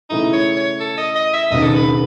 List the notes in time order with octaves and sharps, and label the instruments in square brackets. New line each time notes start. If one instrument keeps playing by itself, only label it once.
[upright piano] C#3 E3 A3 E4 [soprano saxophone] D#4
[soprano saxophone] C#5
C#5
A4
D#5
D#5
E5
[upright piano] E1 D#2 C#3 [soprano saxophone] D#5
[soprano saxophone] A4
B4